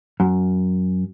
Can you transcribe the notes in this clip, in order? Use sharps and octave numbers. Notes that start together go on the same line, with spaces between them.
F#2